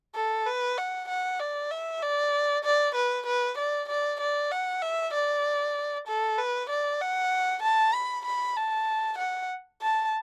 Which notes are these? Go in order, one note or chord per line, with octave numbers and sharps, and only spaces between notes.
A4
B4
F#5
F#5
D5
E5
D5
D5
B4
B4
D5
D5
D5
F#5
E5
D5
A4
B4
D5
F#5
A5
B5
B5
A5
F#5
A5